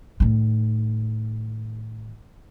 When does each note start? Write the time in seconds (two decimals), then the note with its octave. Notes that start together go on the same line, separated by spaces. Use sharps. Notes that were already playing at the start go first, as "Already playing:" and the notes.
0.20 A2 D#3